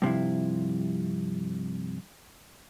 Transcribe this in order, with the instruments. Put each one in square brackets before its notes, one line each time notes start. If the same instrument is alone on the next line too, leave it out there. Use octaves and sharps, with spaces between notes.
[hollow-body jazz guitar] G2 C3 F3 E4